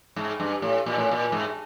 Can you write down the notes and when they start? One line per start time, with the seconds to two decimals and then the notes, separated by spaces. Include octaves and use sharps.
0.16 G#2
0.40 G2
0.62 A2
0.86 A#2
0.98 A2
1.11 A#2
1.32 G#2